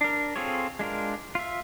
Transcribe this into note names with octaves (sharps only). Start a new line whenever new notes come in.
D4 A#4
C4 F4 G#4 A4 C#5
G#3 D4 F4 A#4
F4 E5